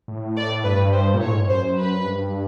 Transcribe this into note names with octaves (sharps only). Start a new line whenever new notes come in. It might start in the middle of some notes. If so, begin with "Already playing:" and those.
A2
D5
G2 B4
C5
A#2
A2 C#5
G#2
G2
F#2 C5
B4
G2